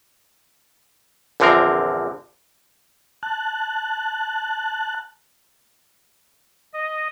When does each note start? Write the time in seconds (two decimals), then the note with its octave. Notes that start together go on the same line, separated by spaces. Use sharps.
1.40 A#1 E2 D3 F3 C4 A#4
3.23 A5 F#6
6.74 D#5